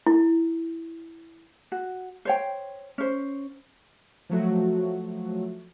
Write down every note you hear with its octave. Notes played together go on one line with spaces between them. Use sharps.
E4
F#4
C5 C#5 G5
C#4 C5
F3 F#3 A3 F#4